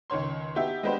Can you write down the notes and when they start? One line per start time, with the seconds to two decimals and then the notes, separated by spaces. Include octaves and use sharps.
0.10 C#2 D#3 C#5 C6
0.55 B3 D#4 G4 E5
0.83 G#3 B3 D4 G4 B4 C5